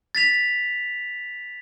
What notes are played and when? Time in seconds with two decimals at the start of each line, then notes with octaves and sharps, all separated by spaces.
0.15 A6 B6 F7